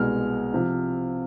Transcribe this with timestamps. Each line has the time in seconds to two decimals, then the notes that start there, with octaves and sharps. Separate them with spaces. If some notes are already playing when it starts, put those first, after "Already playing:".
Already playing: C2 B2 G#3 F6
0.54 C3 F3